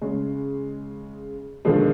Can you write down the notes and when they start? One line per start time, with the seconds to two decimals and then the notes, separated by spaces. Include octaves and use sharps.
0.01 C#3 G#3
1.65 B2 D3 D#3 F3 G#3